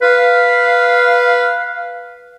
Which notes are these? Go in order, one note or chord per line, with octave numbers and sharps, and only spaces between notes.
B4 F5